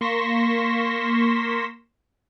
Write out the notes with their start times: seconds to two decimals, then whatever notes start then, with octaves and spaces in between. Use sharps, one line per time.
0.01 A#3 C6 C#6 A#6 B6 E7